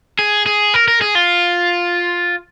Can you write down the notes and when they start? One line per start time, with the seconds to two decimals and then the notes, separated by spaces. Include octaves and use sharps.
0.19 G#4
0.46 G#4
0.74 A#4
0.88 A#4
1.01 G#4
1.15 F4